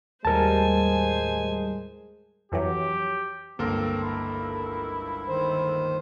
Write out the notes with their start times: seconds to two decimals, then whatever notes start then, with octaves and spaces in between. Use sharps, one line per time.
0.25 D#2 A2 G3 G#3 A#4 C5 G#5 A5
2.52 F2 E3 F#3 G4
3.59 G1 C#2 A#3 C4 A4 A#4
4.03 E4
5.28 D#3 C5